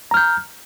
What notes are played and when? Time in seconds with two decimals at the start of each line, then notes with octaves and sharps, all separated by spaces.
0.11 A#5
0.14 F6
0.17 G6